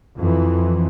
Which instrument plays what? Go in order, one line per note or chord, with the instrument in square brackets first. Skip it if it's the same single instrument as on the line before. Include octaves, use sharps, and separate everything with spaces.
[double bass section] F2 E3